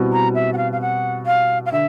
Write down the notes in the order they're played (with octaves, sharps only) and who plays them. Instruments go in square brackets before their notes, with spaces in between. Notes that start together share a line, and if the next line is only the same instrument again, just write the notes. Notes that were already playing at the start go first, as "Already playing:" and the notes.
Already playing: [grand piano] B2 G3 C4 E4
[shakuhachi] A#5
E5
F#5
F5
F5
F#5
F5
F5
[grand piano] D3 [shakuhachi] E5